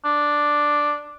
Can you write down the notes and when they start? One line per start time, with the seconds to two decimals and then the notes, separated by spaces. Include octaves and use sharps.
0.05 D4